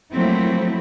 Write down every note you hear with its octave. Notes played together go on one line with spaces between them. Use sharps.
F3 F#3 A3 A#3 C4 E4